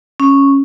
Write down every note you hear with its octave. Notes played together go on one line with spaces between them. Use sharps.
C#4